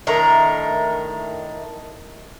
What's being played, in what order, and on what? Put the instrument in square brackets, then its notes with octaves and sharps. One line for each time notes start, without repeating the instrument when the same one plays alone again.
[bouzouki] A2 D#3 D4 A#5